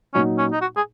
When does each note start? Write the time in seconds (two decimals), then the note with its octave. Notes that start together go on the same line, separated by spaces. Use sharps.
0.14 A#2 F#3 C#4 D#4 F#4
0.38 C#4
0.52 D#4
0.61 F#4
0.76 G#4